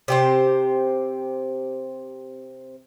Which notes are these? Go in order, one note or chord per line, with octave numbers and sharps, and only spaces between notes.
C3 G4 C5